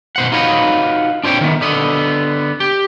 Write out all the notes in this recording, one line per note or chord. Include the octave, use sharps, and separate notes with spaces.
B2 C5 F#5
D#4 F4 F#4 B4 C#5 D#5
D4 F4 C5 C#5 G5
D#3 B3
D3 B3 D#5
G4